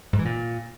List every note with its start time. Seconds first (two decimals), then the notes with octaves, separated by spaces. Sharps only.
0.13 G#2
0.19 E3
0.25 A#2